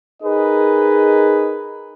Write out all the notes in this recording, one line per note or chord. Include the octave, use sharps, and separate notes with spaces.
D#4 G#4 A#4 B4 D#5